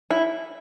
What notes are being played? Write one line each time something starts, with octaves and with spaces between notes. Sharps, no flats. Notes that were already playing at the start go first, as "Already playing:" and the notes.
E4